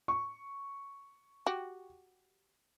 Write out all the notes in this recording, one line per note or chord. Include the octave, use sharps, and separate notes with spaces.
C#6
F#4 G4